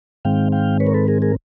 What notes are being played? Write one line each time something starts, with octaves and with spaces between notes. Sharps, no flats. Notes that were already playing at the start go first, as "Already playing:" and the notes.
G#2 D#3 G#3 C4 F5 G5
F5 G5
B4 C#5
A#4
A4 B4
G#4 A#4
G#4 A#4